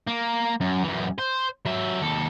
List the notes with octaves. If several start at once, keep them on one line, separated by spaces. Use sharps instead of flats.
A#3
F#2
F#2 E3
C5
F#3 E5
D#2 A4